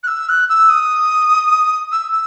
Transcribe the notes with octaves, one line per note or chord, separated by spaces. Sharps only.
F#6
E6
F#6
E6
D#6
E6
E6